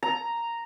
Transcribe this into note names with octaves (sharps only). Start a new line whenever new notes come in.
A#5